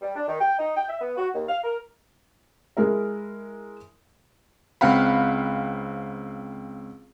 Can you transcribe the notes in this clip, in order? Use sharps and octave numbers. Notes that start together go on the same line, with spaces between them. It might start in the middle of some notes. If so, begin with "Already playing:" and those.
G3
D4
D#3
G5
D#4
G5
E5
B3
F#4
D#2
F5
A#4
G#3 E4 A#4 E5
C#2 C4 F5 F#5 B5